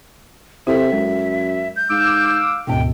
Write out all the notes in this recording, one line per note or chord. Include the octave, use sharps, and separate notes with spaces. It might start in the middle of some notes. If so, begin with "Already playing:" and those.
C3 E4 A4 E5
F#2 G#3
G6
G#2 F5 D6 E6
E1 D2 G#2 B2 G5